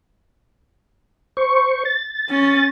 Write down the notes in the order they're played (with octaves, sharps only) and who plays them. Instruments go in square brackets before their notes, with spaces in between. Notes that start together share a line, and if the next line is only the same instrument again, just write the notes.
[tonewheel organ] C5 C#6
A6
[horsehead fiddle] C#4